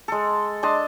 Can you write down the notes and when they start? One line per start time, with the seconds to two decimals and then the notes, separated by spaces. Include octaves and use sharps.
0.08 G#3 A4
0.63 D4 D#5 A5 C6